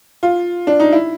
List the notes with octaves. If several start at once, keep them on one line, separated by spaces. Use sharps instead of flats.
F4
D4
D#4
E4